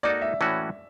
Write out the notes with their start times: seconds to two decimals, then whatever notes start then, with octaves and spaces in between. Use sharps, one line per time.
0.03 A#3 D#4 F#4 A4 D5
0.22 E5
0.41 A2 E3 A3 C#4 F#4